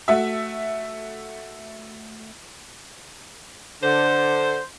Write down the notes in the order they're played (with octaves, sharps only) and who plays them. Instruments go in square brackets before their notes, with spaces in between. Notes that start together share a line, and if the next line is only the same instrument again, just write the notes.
[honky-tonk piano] A3 F#4 E5
[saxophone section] D3 C5